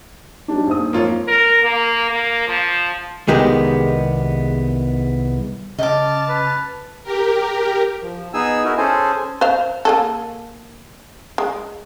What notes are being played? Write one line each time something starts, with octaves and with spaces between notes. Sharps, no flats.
F#3 G3 D4 D#4
A#1 C4 D#6
G#1 F2 A#3 F4 C#5
A#4
A#3
A#3
F3
C2 D#3 G#3 B3 G4 D#5
C#3 D#5 A5 D6 F6
B4
G4 A#4
F3
B3 D#4 G#4 G#5 E6
D#4 E4 F#4 A#4
C#4 G#4 A4 C5 G#5
C5 F5
A#3 G#4 A4
G#3